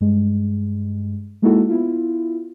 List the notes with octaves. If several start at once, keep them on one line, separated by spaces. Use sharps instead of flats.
G2 G#3
G#3 A#3 D#4 E4 F#4 A4
B3 E4 F4